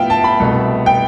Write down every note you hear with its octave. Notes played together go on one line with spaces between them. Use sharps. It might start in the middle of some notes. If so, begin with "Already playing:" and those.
Already playing: A2 F3 B3 E5 F5 G5
A5
B5
C2 B2 A3
G5